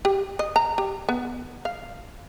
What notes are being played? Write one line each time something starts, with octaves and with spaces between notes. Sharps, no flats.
G4
D#5
A#5
G4
B3
F5